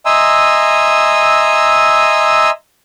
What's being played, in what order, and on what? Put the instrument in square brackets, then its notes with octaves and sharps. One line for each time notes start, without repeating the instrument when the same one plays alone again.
[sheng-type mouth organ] D#5 E5 G#5 A#5 C6 E6